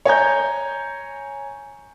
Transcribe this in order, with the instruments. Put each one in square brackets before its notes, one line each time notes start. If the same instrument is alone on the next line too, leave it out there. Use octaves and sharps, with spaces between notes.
[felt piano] C#5 G#5 A#5 G6